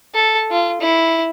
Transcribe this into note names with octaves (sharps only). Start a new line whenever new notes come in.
A4
F4
E4